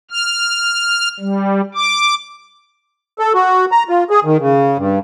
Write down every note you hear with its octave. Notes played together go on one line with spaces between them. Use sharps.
F6
G3
D6
A4
F#4
A#5
F4
G#4
D#3
C#3
G2